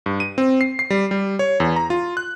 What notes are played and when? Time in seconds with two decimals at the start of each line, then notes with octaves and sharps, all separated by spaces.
0.06 G2
0.20 D#7
0.38 C4
0.61 C7
0.79 C7
0.90 G3
1.11 G3
1.39 C#5
1.60 E2
1.76 A#5
1.90 F4
2.17 F#6